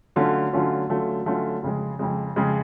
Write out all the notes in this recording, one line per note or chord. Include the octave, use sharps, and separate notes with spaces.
D3 F#3 A3 C#4 F4
D3 F#3 A3 C#4 F4
D3 F#3 A3 C#4 F4
D3 F#3 A3 C#4 F4
F2 C#3 G#3
F2 C#3 G#3
F2 C#3 G#3